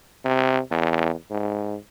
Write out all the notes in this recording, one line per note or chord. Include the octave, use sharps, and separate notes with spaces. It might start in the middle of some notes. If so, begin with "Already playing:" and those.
C3
E2
G#2